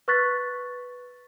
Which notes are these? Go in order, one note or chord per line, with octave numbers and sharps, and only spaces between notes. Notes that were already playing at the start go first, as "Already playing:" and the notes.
B4 C#6 F#6 A6 B6